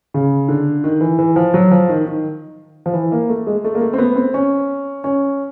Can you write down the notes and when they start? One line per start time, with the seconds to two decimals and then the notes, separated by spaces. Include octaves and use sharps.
0.14 C#3
0.49 D3
0.84 D#3
1.01 E3
1.19 E3
1.36 F3
1.54 F#3
1.71 F3
1.89 D#3
2.06 D#3
2.86 F3
2.94 E3
3.12 A#3
3.29 A3
3.47 G#3
3.64 A3
3.75 A#3
3.81 A3
3.93 C4
3.98 B3
4.16 C4
4.34 C#4
5.04 C#4